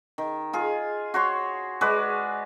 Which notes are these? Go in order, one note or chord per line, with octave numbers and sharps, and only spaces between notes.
D#3
F4 G#4
F#4 C#5 C6
G#3 F#4 B4 D5